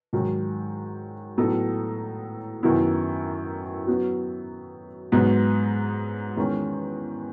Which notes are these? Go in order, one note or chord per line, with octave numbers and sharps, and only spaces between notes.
G#2 D#3 F#3
A2 F#3 B3 D#4 A4
F#2 D#3 F#3 B3 E4
F#3 B3 F#4
G#2 F#3 B3 D#4
E2 D#3 G#3 C#4